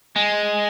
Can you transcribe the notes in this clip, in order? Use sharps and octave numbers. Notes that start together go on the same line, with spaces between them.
G#3